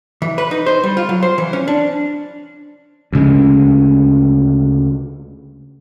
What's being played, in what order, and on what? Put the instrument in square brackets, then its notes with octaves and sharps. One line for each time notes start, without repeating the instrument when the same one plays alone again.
[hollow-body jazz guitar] E3
B4
D#4
C5
G3
F4
F#3
C5
E3
C#4
D4
[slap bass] D2 C#3 G#3